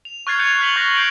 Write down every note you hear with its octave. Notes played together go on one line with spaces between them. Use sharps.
F7
C#6 F6 F#6 G#6 A6 C7
G6 C#7 F7
F#6 B6 F#7 G7
C#6 G6 A#6
G6 C7 D7 F7